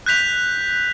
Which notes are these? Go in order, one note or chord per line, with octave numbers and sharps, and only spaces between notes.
F#6 G6 B6 F7